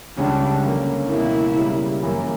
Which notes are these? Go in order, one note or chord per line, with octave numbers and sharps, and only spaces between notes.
C#2 C#3 G3 C#4 D4
D3 F#3 A#3 C#4
C#2 B2 A#3 E4
C#3 G3 A#3
F#2 E3 A#3 E4